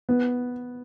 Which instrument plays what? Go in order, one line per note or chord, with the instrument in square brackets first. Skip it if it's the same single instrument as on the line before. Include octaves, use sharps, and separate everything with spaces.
[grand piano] B3